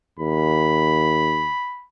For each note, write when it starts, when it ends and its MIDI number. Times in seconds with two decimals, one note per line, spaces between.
0.19 1.50 39
0.19 1.86 83